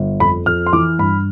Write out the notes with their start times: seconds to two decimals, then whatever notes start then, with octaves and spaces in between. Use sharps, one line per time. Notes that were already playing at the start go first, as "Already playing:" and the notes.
Already playing: G1
0.20 F2 B5
0.46 F2 F6
0.67 C6
0.73 E3 D6
0.99 G2 B5